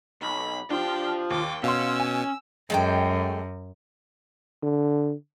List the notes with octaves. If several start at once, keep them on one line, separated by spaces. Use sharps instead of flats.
B1 B5
D4 F4 G4 C5 G5
D#2 G5 D6
B2 C#4 F5 C6 E6
G#5
F#2 G#3 A3 G5
D3